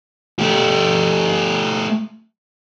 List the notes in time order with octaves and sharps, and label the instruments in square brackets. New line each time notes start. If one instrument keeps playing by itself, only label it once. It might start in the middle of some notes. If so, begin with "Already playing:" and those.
[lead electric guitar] A3 G4